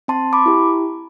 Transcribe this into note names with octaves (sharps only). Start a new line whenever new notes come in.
C4 A5 C6
B5 D6
E4 G4